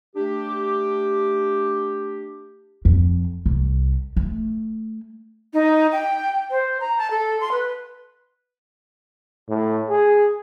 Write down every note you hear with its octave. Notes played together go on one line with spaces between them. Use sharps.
A3 D4 G4
F2
C2
A3
D#4
G5
C5
A#5
A5
A4
C6
B4
A2
G#4